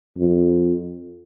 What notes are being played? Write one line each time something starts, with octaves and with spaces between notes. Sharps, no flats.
F2